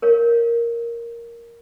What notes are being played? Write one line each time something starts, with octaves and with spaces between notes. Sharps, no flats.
A#4 C#5 F5